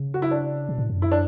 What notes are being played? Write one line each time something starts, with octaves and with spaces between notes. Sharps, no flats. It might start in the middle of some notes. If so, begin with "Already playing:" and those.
Already playing: C#3
F#4
E4
D4
B2
A2
F#2
E4
D4